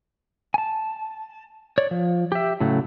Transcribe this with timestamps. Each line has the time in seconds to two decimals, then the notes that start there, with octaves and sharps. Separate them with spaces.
0.54 G#5 A5
1.78 C#5 D5
1.91 F3
2.32 G4 E5
2.60 A2 C#3 F#3 A3